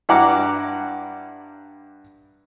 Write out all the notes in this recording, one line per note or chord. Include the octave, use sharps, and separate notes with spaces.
G2 E4 F#5 A#5 D6